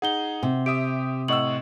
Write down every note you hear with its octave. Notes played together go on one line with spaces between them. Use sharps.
D#4 G#4 F#5 G7
C3
G4 E5 D#6 D7
A2 D#5 F#5 C#6 E6 F#7